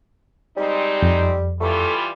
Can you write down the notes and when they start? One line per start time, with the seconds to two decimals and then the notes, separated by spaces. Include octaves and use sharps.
0.57 G3 G#3 C4 D#4
1.02 F2
1.60 E3 G3 A3 F4